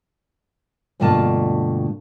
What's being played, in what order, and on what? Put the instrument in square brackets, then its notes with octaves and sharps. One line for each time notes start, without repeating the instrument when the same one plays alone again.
[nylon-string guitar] D2 G2 B2 A#3 F4 A5